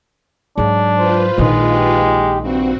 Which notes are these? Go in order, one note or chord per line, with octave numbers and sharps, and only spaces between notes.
G#2 F#3 D4
F4 B4 C5
A#1 D#3 G#3
G4
G2 C4 F#4